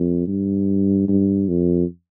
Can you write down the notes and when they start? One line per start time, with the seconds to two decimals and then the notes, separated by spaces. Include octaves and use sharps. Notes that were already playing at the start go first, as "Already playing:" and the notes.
Already playing: F2
0.27 G2
1.08 G2
1.48 F2